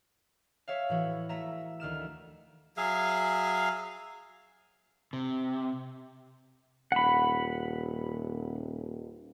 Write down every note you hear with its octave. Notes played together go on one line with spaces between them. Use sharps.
C#5 E5 F5
A2 E3 F#4
A3 E5 A#5
D2 D#3 F6 E7
F#3 G#4 E5 F5
C3
D#1 F#5 B5